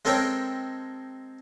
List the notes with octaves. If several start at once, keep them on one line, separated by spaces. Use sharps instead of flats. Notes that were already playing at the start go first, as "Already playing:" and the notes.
G#3 C4 A4 A#4 C#5 G5